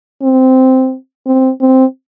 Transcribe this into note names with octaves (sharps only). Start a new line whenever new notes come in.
C4
C4
C4